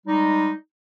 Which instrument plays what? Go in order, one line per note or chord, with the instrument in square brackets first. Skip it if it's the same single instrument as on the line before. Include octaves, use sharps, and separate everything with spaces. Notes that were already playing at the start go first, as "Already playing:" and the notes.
[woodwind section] G3 G#3 D#4